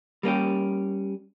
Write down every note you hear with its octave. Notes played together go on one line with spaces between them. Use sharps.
G3 A#3 C#4 G4